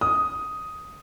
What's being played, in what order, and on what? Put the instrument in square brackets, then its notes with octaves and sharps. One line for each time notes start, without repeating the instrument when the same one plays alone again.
[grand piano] D#6